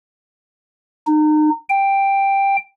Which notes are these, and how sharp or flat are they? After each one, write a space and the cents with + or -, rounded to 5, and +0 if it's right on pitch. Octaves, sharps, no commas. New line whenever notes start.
D#4 -30
G5 +5